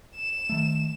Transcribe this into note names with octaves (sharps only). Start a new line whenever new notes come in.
E7
D#3 A3